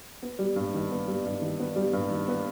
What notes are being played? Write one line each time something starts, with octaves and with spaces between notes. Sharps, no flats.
B3
G3
G2
D#3
B3
G3
G2
D#3
B3
G3
G2
D#3
B3